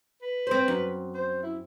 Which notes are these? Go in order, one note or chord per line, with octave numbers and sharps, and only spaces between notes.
B4
C4 C5
F#2
C5
E4